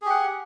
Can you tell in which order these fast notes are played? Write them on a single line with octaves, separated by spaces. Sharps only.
G#4 G4 F#5